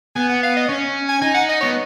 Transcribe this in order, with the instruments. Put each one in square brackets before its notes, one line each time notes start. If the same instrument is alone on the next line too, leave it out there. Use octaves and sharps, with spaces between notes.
[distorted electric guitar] B3 [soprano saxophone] G#5
[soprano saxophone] F#5
F5
D#5
[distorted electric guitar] C#4 [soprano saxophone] C#5
[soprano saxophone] G#5
[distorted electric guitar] D#4 [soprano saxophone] G#5
[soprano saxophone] F#5
D#5
[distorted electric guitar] B3 [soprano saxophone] C#5